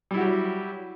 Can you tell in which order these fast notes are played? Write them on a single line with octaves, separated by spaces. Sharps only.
G3 E4 F#4 G4 F#3